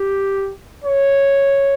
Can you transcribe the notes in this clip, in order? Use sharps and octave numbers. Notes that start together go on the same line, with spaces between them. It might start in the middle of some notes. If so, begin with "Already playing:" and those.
Already playing: G4
C#5